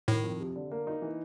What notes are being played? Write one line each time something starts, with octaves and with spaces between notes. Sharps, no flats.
A2 D#3
F2
C3
D3
A#3
D#4
E3